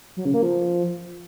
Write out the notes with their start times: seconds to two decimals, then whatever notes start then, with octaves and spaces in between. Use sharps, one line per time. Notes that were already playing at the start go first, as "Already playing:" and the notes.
0.17 F#3
0.25 C#3
0.34 A#3
0.43 F3